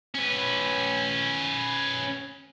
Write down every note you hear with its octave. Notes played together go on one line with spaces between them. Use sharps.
C#4 B4